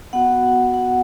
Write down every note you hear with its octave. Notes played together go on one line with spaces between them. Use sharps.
B3 F#4 F#5
F#5